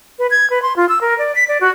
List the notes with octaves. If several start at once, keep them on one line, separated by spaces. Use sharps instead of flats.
B4
G#6
B4
C6
F4
E6
A#4
D5
B6
D5
F#4